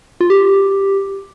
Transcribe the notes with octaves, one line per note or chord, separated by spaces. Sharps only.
F4
G4